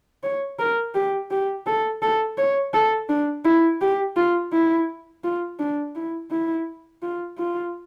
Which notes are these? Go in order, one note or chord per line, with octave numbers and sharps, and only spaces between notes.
C#5
A#4
G4
G4
A4
A4
C#5
A4
D4
E4
G4
F4
E4
F4
D4
E4
E4
F4
F4